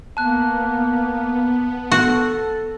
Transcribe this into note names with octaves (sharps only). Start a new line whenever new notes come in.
A#3 B3 A5 F#6
F#4 A4